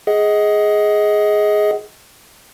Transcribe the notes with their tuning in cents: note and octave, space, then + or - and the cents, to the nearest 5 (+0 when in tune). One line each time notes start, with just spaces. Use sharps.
G#4 +5 D#5 +20 F#5 +15